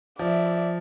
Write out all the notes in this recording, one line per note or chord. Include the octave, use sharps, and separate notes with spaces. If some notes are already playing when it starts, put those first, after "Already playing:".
F3 D5 E5